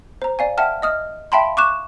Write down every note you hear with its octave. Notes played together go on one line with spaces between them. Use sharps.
C5 A#5
D5 F5 G#5
E5 F#5 G5 A5 F6
D#5 D#6 F6
E5 F5 G5 A5 B5 C6
C#6 D6 F#6 E7